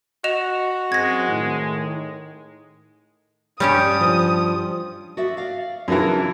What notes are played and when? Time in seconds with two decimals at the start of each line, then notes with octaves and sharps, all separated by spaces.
0.24 F#4 D#5 E7 F7
0.92 F#2 G#3 C4 G#6 A#6
1.28 A2 D#3
3.60 G2 G3 C#4 G4 D#6
4.01 F3
5.17 F#4 D5 E5
5.37 D5 F5
5.88 F#2 C#3 E3 D4 D#4 A#4